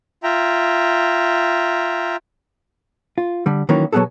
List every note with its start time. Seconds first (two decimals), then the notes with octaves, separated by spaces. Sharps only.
0.23 F4 E5 G5 A#5
3.18 F4
3.46 D3 G3
3.69 D#3 E3 F#3 A#3 C#4
3.93 B2 F#3 G#3 B3 G#4 A4